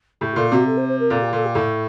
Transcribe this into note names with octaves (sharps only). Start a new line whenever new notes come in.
A2 G4
A#2 A4
C3 F#4
A4
C5
C5
A#4
A#2 A4
G4
A#2 A4
G4
A2 A4